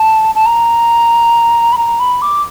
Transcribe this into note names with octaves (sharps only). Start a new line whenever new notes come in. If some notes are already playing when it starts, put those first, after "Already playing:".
Already playing: A5
A5
A#5
B5
A#5
B5
D6